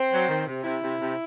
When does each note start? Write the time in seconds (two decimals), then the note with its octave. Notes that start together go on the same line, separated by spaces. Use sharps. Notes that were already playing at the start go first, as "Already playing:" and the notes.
Already playing: C4
0.12 F#3
0.29 D#3
0.47 C3
0.64 C3 E4
0.81 C3
0.99 C3